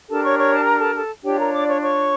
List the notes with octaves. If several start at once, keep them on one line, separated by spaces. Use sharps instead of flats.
D4 G4 A4 A#4 A5
C#5 C#6
C#5 C#6
A5
A#5
A4 A5
A4 A5
D4 F4 G4 C#5 G5
A#4 A#5
D5 D6
C#5 C#6
C#5 C#6